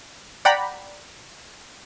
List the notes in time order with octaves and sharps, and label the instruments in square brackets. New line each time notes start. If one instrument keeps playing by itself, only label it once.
[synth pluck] D5 F#5 G5 A#5 B5